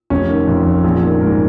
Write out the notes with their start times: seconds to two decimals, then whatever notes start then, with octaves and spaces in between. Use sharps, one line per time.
0.10 F1 C#4
0.29 D#3
0.47 F2
0.66 F1
0.84 A#1
1.03 D#3
1.21 G#2 A#4